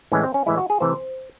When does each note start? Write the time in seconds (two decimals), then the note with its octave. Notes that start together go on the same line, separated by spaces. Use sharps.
0.12 A2 E3 G#3 C#4
0.23 C4
0.34 C#4
0.46 A2 E3 G#3 E4
0.58 F#4
0.70 G#4
0.80 C3 E3 A3 C5